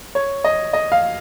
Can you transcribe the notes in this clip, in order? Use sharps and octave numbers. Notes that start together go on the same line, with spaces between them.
C#5
D#5
D#5
F5